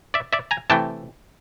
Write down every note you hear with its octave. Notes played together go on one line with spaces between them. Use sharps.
D5 E5
D5 E5
G#5 A#5
C3 E3 A3 G5 A5